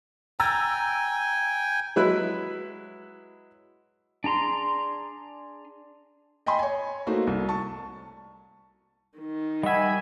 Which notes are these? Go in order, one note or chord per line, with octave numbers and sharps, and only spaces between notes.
G5 G#5 A#5 E6 A6
F#3 G#3 E4 B4 F#6
D4 G#4 A#5 C6
D#5 G5 G#5 B5 C6
C#5 G#5
A3 A#3 D#4 F#4 C5
C2
A5 C#6
D#3
G3 D#5 E5 F#5 G#5 B5